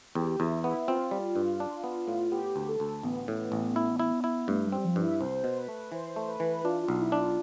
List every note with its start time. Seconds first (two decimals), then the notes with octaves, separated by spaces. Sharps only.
0.15 E2 G4
0.39 E2 E4
0.64 B3 E4
0.87 C4 F4
1.11 G3
1.36 G2
1.60 D4
1.84 B3
2.07 A2
2.31 B3 G4
2.56 D2
2.68 A4
2.80 D2
3.03 A1 B3
3.28 A2
3.52 A1
3.76 E4
4.00 E4
4.24 E4
4.48 G2 A3
4.66 G3
4.72 C4
4.84 F3
4.96 G2
5.02 E4
5.20 C2 C5
5.44 B2
5.57 B4
5.68 A3
5.92 E3 C5
6.16 A3
6.28 B4
6.40 E3
6.64 D4 F4
6.82 F4
6.88 B1
7.00 E4
7.12 D4
7.18 F4